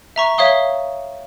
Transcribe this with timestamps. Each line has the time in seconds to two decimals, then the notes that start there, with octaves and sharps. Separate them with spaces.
0.16 E5 A#5 C#6
0.38 C#5 E5 F5 D#6 G7